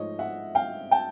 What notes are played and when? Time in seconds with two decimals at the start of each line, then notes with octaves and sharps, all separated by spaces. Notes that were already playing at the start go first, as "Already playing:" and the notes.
Already playing: G#2 F3 A3 C#5 D#5
0.19 E5 F#5
0.55 F5 G5
0.91 G5 A5